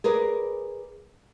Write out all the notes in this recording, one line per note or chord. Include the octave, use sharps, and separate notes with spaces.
G#4 A#4 B4 D5